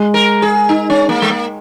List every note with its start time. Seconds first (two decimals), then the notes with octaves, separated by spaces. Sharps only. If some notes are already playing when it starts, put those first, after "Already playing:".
Already playing: G#3
0.14 A#4
0.42 G#4
0.69 D#4
0.90 C#4
1.09 A#3
1.22 G#3
1.30 A#3